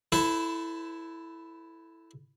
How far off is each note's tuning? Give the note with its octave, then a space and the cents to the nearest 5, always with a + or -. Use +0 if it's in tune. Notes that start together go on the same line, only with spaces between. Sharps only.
E4 +0 A4 +5 C5 -45